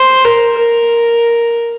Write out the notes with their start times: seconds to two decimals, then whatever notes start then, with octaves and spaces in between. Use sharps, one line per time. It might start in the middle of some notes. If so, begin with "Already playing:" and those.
Already playing: C5
0.25 A#4
0.58 A#4